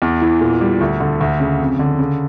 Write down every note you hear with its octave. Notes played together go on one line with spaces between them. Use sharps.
E2
E3
A#2
G3
D2
D3
D2
C#3
F2
D3
C#3